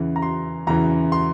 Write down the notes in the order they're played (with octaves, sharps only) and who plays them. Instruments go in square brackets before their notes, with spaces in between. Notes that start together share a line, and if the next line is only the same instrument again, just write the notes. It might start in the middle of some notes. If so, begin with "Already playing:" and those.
Already playing: [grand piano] E2 C#3 E3
A#5
C6
E2 C#3 E3 A#5
C6